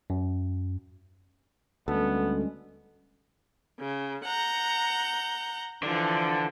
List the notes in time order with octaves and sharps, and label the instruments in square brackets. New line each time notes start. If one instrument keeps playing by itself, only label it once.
[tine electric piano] F#2
[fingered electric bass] D2 [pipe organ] G3 G#3 C#4 [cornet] B3 [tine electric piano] A4
[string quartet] C#3
F#5 A#5 G6
[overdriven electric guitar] D3 [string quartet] E3 F3